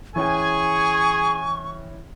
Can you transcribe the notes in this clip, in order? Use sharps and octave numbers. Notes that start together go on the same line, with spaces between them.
E3 C#4 G#4 G5 G#5 C#6